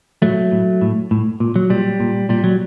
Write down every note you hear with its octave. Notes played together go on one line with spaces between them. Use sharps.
A2 F#3 A3
A2
A2
A2
A#2
F#3
A#2 G3
A#2
A#2 G3
F#3